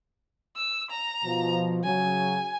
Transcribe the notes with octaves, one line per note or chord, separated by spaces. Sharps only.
E6
A#5
B2 F3
C#3 F#3 G#5